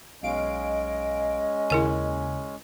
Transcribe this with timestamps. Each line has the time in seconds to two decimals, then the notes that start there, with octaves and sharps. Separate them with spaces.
0.23 B1 G#3 C#4 D#5 F5 D7
1.70 D#2 C#3 E4 A#4 G#5